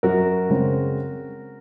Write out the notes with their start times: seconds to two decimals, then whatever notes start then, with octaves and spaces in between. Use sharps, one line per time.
0.03 F#2 F#4 A#4
0.50 C#3 G#3 C4